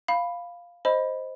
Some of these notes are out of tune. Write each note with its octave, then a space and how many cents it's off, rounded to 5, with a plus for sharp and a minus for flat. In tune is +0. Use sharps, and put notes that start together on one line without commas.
F5 +0 B5 +0
C5 +0 D#5 +0 B5 +0